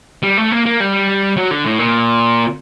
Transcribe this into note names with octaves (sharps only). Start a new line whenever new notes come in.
G3
A3
A#3
A#3
G3
F#3
D3
A2
A#2